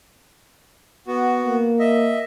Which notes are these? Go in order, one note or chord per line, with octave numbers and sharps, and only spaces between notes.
B3 F#4
A#3
D#5 E5